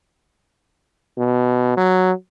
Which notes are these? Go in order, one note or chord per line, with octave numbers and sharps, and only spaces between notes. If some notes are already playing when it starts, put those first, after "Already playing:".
B2
F#3